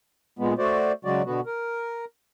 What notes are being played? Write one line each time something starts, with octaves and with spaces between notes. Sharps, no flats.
A#2 G#3 B3
A3 F#4 C5 D5
C#3 F#3 G#3 F#4 D5
B2 D3 B3 F#4
A#4